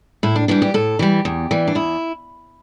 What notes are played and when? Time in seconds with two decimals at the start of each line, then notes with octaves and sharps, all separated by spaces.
0.23 A2 E4
0.36 D4
0.48 E3 G3 D4
0.62 G4
0.74 A2 A4
0.99 E3 G3 G4
1.25 E2
1.51 E3 G3
1.68 D4
1.75 E2 E4